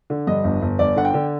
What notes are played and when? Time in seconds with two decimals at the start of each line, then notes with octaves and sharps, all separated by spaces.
0.10 D3
0.27 G2 D#5
0.44 G1
0.62 G1
0.79 G1 D5
0.96 D3 F#5
1.05 G5
1.14 D3